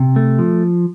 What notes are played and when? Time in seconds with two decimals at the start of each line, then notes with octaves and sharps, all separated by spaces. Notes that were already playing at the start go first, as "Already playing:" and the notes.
Already playing: C3
0.16 A3
0.39 F3